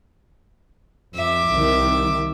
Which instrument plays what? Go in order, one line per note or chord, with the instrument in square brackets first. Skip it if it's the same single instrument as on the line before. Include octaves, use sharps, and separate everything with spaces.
[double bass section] F2 [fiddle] E5 D6
[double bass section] C2 D#3